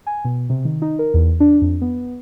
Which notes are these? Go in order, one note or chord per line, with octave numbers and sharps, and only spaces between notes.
G#5
B2
C3
D#3
D#4
A#4
E2
D4
F2
B3